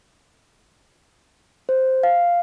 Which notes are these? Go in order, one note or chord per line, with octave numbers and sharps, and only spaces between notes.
C5
F5